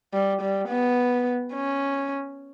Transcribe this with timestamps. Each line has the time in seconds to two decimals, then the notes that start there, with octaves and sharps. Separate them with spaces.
0.14 G3
0.42 G3
0.69 B3
1.53 C#4